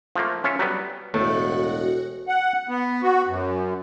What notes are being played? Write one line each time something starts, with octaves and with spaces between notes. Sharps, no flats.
F3 A3 A#3
C#4 F4 C#5 E5
F#3 G3 B3
E1 A2 A3 F#4 F#5
F#5
B3
F#4
F#2